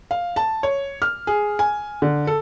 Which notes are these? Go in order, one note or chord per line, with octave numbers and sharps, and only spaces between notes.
F5
A5
C#5
F6
G#4
G#5
D3
A4